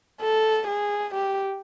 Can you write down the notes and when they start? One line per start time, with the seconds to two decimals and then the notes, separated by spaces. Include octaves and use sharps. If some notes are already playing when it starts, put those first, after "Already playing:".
0.22 A4
0.68 G#4
1.14 G4